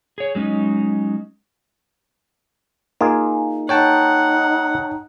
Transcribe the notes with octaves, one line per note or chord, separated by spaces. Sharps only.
G#4 C#5
F#3 G#3 C#4 D#4
A#3 D#4 F4 G#4
D#4 C#5 F#5 G5 A5